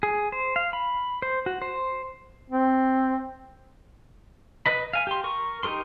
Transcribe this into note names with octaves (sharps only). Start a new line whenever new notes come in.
G#4
C5
F5
B5
C5
F#4
C5
C4
B4 D#5 B5
F5 G#5
G4 C6
A#4 C#6
D#4 G4 A#4 C6